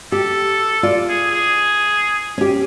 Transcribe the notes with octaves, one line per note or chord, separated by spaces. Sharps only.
G4 A4
F4 D5
G#4
G#4
C#4 G4